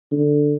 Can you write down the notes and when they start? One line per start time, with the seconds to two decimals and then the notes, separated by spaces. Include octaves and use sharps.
0.11 D3